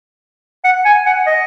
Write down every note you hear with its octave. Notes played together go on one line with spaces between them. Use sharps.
F#5
G#5
F#5
D#5